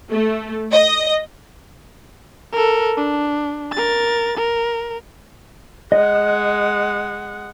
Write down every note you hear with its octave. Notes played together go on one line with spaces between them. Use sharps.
A3
D#5
A4 A#4
D4
A#4 A6
A#4
G#3 D#5 F#5